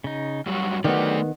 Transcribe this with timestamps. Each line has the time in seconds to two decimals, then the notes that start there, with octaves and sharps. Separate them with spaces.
0.04 C#3 D#4
0.46 G2 F#3 G3 F#4
0.84 D#3 F#3 A3 B3 G4 A4 D5